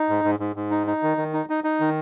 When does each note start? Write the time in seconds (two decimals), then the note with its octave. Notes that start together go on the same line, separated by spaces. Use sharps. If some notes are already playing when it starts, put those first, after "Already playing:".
Already playing: D#4
0.09 G#2
0.24 G#2
0.39 G#2
0.56 G#2
0.71 D#4
0.87 D#4
1.03 D#3
1.17 D#3
1.33 D#4
1.49 D#4
1.64 D#4
1.80 D#3